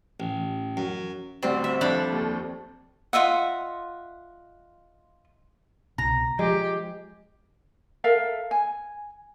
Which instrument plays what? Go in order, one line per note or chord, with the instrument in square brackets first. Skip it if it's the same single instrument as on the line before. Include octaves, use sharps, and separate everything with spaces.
[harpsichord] A1
F#2
[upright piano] A1 D2 G3 [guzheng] C4
[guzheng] E5
F2 D4 B5
[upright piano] D#2 A4
[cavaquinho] F4 D#5 E5 F#5
[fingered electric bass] C2 B2 [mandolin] A#5
[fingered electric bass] F3 [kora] G#3 [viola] G4
[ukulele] A4 A#4 E5 F5
G#5